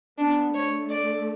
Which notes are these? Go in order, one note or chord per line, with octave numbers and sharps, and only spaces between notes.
B3 D4
A3 C#5
D5